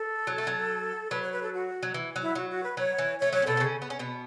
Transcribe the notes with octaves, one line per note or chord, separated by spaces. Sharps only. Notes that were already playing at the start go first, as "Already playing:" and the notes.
Already playing: A4
F#3
A3
F#3
F#3 B4
C#5
B4
A4
F#4
F#3
E3
F#3
E4
F#3 F#4
F#4
B4
F#3 C#5
E3
A3 C#5
F#3 C#5
C#4
B2 B3 A4
B3
C#3 C#4
B3
C#4
B2 B3